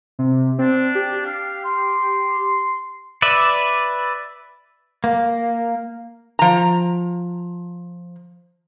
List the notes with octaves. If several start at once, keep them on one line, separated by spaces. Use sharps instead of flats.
C3
C4 D4
G4
F5
C6
B4 D5 E5
A#3
F3 A#5